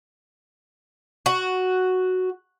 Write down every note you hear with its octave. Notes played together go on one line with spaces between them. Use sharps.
F#4